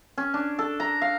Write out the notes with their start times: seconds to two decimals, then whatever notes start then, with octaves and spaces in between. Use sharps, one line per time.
0.18 C#4
0.34 D4
0.59 A4
0.80 A#5
1.02 F5